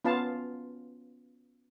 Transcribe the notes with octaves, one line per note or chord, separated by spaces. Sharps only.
B3 C#4 F4 F5 A5